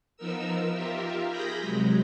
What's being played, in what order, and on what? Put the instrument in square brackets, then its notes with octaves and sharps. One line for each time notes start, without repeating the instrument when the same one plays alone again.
[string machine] F3 B3 D#4 A#4 E6
F4 G4 A#4 E5
G#4 B5 G6 A#6
C3 F#3 G#3